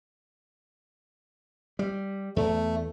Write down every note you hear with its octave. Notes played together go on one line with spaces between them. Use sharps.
G3
E2 A3